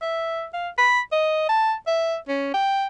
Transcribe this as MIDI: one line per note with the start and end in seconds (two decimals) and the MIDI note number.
0.01 0.46 76
0.53 0.69 77
0.78 1.00 83
1.12 1.46 75
1.49 1.74 81
1.87 2.16 76
2.28 2.49 61
2.54 2.87 79